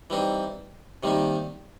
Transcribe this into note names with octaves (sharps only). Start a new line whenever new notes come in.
E3 G3 C4 D#4
C3 D#3 G3 A#3 D#4